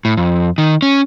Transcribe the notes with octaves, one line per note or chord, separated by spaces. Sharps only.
A2
F2
D#3
C#4